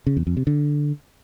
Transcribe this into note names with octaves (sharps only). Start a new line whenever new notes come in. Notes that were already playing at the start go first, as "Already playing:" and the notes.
C#3
E2
F2
C3
D3